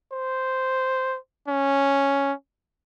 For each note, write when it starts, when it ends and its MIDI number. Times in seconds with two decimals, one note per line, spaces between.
0.12 1.18 72
1.48 2.33 61